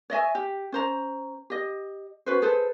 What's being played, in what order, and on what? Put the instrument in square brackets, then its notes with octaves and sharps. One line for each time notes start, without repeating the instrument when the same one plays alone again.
[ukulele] C#5 D#5 E5 G#5
G4
C#4 C5 A#5
G4 D#5
C#4 F#4 B4 C5
G#4 A4 B4 C5